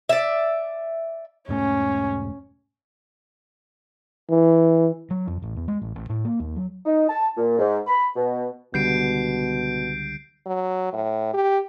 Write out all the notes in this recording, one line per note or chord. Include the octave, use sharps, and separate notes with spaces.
D5 E5
E1 G#2 A3 C#4
E3
F#3
F2
A1
E2
G#3
A1
A1
A2
A#3
D#2
F#3
D#4
A5
A#2
G#2
B5
B2
C#2 B2 D3 G3 G6 C7 D7
F#3
A2
G4